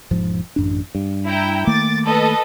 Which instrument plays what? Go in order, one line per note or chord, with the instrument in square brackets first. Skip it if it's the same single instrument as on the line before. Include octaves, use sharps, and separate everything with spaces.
[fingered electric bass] E1 G#2 F3
A1 F#2 D4
G2
[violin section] E4 G5 A#5
[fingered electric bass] D#3 A3 A#3 [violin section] D6 A6
[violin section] A4 B4 D#5